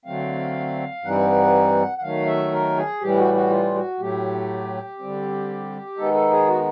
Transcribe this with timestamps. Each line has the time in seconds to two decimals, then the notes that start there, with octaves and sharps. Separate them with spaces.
0.05 D3 F#3 A3 C4 F5
1.04 G2 E3 G3 C4 D#4 F#5
1.98 F#5
2.02 D#3 F#3 A3 F5
2.27 E5
2.52 A#4
2.77 G#4
3.01 A2 E3 G3 G4
3.18 F#4
3.34 F#4
3.50 F4
3.75 F#4
4.00 A2 F#3 A3 G4
4.99 D3 G3 C4
5.97 D#3 G#3 B3 D#4 A4
6.14 A4
6.30 G#4
6.47 F#4